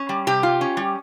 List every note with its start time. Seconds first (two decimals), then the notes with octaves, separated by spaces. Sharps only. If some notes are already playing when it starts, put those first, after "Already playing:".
Already playing: C#4
0.09 G3
0.27 C3 G4
0.43 F4
0.61 C#4
0.77 G3